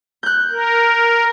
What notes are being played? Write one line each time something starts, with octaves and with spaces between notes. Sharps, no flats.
F#6 G6
A#4